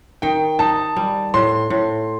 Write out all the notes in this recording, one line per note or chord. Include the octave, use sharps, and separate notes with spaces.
D#3 G5
D#4 A5
G3
A2 C6
A2